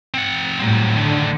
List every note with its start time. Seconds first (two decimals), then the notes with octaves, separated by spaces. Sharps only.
0.14 C4 F#5
0.59 A2 F#3 G3 C4
0.96 D3 D#3 A3